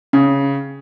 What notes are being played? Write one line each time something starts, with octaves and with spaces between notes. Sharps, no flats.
C#3 C#4